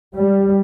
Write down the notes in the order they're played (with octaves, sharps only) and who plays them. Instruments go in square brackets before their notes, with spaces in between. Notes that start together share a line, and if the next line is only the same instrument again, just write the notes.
[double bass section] G3